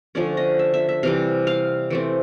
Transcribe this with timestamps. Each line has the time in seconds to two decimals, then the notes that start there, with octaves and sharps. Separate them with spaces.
0.15 D3 F3 A3 C#4 D5
0.37 D#5
0.59 E5
0.74 E5
0.89 E5
1.03 C3 E3 G3 F5
1.47 F5
1.90 E3 A3 C4